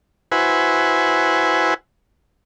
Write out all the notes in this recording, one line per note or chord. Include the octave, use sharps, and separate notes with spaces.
E4 F#4 B4 C5 G#5